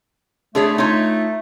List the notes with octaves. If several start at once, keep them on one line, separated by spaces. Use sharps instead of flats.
D3 A3 G#4 C#5
D#4 F4 C#5